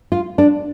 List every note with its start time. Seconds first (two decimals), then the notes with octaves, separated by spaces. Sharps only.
0.12 F4
0.38 D4